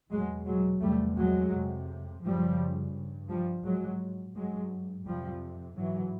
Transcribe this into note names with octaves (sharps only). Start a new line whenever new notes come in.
E2 B2 F#3 G#3
F#3 G#3
E2 C3 G3 A3
F#3 G#3
F2 C3
F#2 C#3 F3 G3
G2
F3 G3
G#2 F#3 G#3
G2 F#3 G#3
F2 C3 F3 G3
G#2 E3 F#3